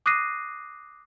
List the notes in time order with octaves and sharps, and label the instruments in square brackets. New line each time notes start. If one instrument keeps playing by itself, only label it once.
[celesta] D6 D#6 F#6 A#6 C7 D#7